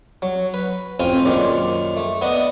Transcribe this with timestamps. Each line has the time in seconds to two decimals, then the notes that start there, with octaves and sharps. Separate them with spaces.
0.22 F#3
0.54 B4
1.00 A1 F2 C4 F4 G#5
1.25 A#1 F#2 D#3 C5 D5
1.97 A3
2.22 B3 D4 D#5